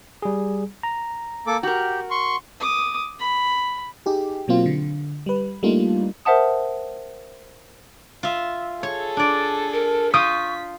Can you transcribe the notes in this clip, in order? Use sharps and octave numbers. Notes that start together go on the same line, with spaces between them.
G3 G#4
A#5
A#3 A4 D6
F#4 G4 A#4
C6 C#6
D6 D#6
B5
D#4 G4 G#4
B2 F#3 A#3 C4 F4
D3
G3 B4
G3 A3 A#3 D4 D#4 F4
A#4 C5 E5 F#5 A5 D#6
F4 E5
G#4 A4 C#5
D4 D5
A#4
F4 C#6 D#6 G6 B6 D7